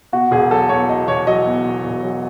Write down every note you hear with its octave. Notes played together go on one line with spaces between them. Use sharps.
B2 F#4
E1 G#4
F#3 A4
E2 C#5
B2 D#5
E1 C#5
F#3 D#5
E2
B2
E1
F#3